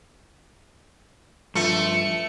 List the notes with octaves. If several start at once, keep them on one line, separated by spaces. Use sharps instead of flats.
G2 F3 A3 C#7